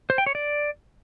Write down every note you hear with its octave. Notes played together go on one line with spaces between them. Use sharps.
C5
G5
C#5
D5